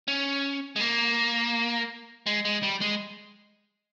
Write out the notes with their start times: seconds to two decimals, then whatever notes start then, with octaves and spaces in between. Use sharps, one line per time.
0.08 C#4
0.76 G#3
0.80 A#3
2.26 G#3
2.45 G#3
2.63 G3
2.81 G#3